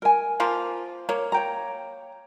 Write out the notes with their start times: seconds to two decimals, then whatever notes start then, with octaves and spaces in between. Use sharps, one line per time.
0.02 A#4 G#5
0.40 F3 A#3 F4
1.09 A#3 C#5
1.32 C#5 G5 A#5